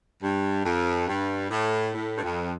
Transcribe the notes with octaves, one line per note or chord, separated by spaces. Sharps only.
G2
F2
G2
A2
A2
G2
F2